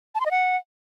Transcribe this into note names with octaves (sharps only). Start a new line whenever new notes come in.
A5
C6
D#5
F#5